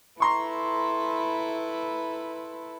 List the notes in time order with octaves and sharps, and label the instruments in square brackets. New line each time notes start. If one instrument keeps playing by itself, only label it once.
[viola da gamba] E4 A4 B4 [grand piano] A#5 C6 C#6